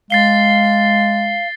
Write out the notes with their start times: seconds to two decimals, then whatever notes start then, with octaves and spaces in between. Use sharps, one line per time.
0.10 G#3 F5 A6 C7 G7